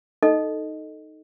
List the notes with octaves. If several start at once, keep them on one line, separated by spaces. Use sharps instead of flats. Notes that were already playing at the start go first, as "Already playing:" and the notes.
D#4 A4 D#5